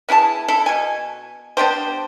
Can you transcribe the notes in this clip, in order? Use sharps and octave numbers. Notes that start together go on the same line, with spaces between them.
B3 E4 G#4 A5
E4 A4
B2 G#5
B3 D4 G4 C5